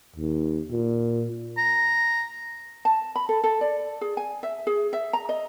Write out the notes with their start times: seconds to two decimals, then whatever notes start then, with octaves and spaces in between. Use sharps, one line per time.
0.16 D#2
0.71 A#2
1.57 A#5
2.85 A5
3.16 B5
3.29 A4
3.44 A4
3.61 D5
4.01 G#4
4.17 G#5
4.43 E5
4.67 G#4
4.93 E5
5.13 A#5
5.29 D#5